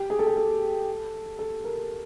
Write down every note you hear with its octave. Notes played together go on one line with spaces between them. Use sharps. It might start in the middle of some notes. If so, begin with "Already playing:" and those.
Already playing: G4
G#4
A4
G#4
A4
A4
A#4